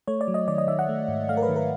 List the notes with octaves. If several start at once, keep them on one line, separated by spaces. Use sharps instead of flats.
A3 C#5
D5
F#3
D#5
D#3 D5
D#5
D#3 E5
F#5
A3
G#2
A3 F5
A#4
B4
D#3
A#4